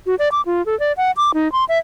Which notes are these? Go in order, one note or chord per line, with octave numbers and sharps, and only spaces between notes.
F#4
D5
D6
F4
A4
D5
F#5
D6
D#4
C6
E5